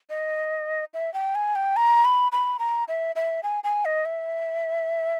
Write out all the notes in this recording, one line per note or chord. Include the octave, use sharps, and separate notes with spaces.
D#5
E5
G5
G#5
G5
A#5
B5
B5
A#5
E5
E5
G#5
G#5
D#5
E5